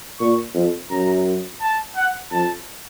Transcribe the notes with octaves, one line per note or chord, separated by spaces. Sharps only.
A#2 C#6
F2
F#2 A#5
A5
F#5
F2 A5